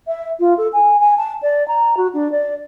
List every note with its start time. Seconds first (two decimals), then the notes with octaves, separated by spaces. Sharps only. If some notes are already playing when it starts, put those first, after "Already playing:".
0.07 E5
0.40 F4
0.58 A4
0.73 G#5
1.00 G#5
1.18 A5
1.42 D5
1.68 A#5
1.97 F#4
2.14 D4
2.32 D5